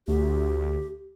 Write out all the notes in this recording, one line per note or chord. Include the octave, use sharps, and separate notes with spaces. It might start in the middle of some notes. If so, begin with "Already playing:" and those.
D2 G4